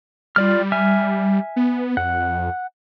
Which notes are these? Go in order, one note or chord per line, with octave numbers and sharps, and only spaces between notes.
G3 F4 D5 F6
E5 G#5 F6
B3
F2 F#5